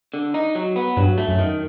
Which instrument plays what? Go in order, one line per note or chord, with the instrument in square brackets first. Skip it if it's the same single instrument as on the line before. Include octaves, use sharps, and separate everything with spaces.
[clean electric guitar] D3
D#4
F#3
B3
[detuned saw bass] G2 [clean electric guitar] F#3
[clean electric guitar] A3
[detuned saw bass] F#2
[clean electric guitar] D#3